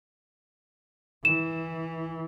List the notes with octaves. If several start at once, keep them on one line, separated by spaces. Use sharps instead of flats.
E3 E7